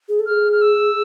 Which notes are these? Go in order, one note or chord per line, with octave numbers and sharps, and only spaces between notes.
G#4
A4
G#4 F6
F6
E6